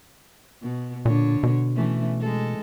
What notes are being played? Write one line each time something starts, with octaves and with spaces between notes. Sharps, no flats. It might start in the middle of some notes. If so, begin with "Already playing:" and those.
B2
A#2 D3 C#5
B2
E3 A3 C#4
G#3 A4